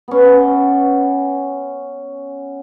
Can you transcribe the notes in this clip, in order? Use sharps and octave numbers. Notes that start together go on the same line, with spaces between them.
B3 C#4